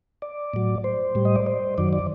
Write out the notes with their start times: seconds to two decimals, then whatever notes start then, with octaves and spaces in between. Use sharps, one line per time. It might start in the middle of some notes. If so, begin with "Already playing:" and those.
0.22 D5
0.54 A2 F#3
0.84 C5
1.15 A2 G3
1.25 D#5
1.36 D5
1.46 C5
1.78 F#2 D#3 F#3 D5
1.93 D5